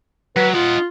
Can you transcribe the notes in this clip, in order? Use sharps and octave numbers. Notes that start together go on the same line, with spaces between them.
F#3 B4
D#4 F4 F#5